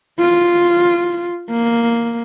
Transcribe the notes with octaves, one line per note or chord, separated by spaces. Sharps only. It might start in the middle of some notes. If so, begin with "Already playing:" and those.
F4
A#3